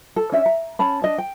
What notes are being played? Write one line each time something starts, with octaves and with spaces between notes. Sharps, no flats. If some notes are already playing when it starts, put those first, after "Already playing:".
A4
C#4 D4 E5
A#5
C#4 A5 B5
D4 D#5 A5
G5